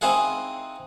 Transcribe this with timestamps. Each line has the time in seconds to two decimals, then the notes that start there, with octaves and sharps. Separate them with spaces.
0.01 C4 D#4 E4 G#4 F5 F#5